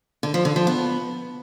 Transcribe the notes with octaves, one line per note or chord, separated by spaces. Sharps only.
D3
F3
D3
F3
B3